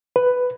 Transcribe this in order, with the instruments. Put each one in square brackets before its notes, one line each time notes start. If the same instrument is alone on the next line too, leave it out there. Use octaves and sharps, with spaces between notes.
[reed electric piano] B4